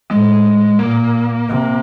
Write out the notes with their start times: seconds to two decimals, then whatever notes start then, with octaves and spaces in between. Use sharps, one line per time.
0.11 A2 G#3
0.79 A#2 A#3
1.49 C3